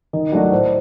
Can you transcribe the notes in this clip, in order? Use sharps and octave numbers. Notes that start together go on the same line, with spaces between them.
D#3 D#5
F#3 A3 D4 F#4 D5
A2 C5